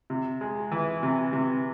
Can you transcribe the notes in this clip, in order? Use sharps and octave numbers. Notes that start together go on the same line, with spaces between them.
C3
G#3
E3
C3
C3